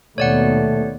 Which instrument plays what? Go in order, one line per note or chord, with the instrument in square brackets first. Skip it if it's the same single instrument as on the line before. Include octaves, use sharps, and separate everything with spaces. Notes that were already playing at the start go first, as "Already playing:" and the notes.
[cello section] D#2 B2 [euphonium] A3 [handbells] C#5 D5 F#5